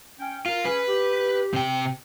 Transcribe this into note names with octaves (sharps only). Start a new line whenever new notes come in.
C#4 G5
F4 A#4
C#4 G#4 B4
G4
C3 G5